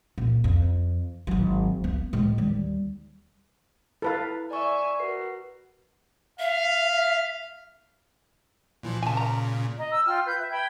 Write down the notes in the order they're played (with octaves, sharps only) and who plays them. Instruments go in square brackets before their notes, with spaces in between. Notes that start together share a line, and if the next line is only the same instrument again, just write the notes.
[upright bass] A#1
F2
G#1 F#3
B3
A2 G#3
D#2 G3
[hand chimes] E4 A6 [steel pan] A4 B4 F5
[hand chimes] D5 C#6 [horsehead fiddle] E5 G#5
[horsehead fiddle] F#4 [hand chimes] A#4 B4 C7
[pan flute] E5 [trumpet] F5
[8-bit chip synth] A#2 E3 F3
[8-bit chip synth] A#2 C#3 [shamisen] G#5 A5
[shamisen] A#5
[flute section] D#5 A#5
E6
F4 G5 F6
B4 G6
E5
G5 B5 G#6